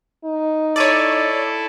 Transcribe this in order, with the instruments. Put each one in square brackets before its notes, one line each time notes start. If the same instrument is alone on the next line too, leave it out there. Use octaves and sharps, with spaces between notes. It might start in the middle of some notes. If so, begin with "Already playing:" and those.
[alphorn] D#4
[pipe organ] E4 A4 [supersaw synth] C#5 D5 [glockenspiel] A6 D#7